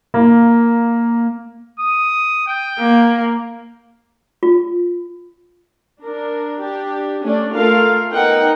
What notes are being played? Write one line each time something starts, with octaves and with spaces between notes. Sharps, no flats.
A#3
D#6
G5
A#3
F4
D4 A#4
D4 G4
A3 C#4 D4 D5
A3 F4 A4 A#4 F5
B3 D#4 A#4 F#5 G5